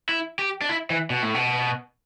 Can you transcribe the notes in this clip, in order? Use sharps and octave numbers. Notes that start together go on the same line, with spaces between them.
E4
G4
D4
E4
E3
B2
A2
B2